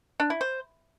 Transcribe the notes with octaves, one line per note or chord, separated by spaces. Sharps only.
D4
E4
C5